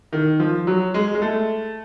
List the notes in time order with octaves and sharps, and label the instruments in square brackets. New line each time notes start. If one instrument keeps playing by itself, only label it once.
[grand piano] D#3
F3
F#3
G#3
G#3
A3